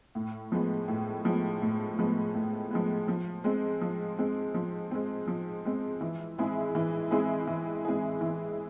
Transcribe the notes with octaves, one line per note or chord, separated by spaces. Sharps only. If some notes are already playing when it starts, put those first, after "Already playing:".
A2
F3 G#3 B3
A2
F3 G#3 B3
A2
F3 G#3 B3
A2
F3 G#3 B3
F3
G#3 C4
F3
G#3 C4
F3
G#3 C4
F3
G#3 C4
E3
G#3 C4 E4 G#4
E3
G#3 C4 E4 G#4
E3
G#3 C4 E4 G#4
E3